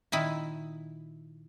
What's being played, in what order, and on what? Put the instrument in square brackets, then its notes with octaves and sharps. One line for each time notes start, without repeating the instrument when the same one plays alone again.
[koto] A#2 D#3 E4